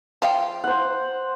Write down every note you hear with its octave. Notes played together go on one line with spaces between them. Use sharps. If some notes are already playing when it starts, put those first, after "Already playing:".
F3 F5 G5
C5 F#5